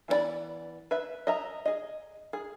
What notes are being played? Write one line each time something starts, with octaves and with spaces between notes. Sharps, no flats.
E3 B3 F#4 D5 B5
B4 E5
D#5 E5 A#5
G#4 D#5
G#4